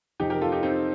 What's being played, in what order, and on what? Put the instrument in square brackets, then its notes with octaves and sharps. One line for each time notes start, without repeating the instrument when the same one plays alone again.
[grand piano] F2 C3 F3 D#4 G4
G4 A#4
F4 A4
D#4 G4
C4 D#4